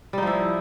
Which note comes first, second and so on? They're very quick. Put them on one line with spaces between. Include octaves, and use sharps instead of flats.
G3 D#4 F3 E4